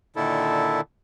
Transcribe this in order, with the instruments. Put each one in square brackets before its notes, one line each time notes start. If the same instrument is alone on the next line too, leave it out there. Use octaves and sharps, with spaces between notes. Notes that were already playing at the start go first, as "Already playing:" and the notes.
[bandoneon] A#2 D3 D#3 E4 A4